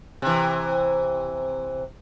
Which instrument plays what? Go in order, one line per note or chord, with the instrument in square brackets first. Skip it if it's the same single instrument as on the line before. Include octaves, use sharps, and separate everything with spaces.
[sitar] C3 E3